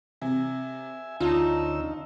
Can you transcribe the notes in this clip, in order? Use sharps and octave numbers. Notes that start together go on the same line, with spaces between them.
C3 E5 G#5
D2 C#4 D#4 F4 A5 E6